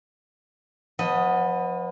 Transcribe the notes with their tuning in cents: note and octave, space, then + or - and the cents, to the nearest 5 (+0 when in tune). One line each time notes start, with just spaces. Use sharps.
F3 +40 B3 +0 D#5 +0